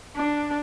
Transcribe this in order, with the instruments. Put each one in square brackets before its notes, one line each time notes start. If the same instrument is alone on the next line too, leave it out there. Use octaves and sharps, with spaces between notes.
[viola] D4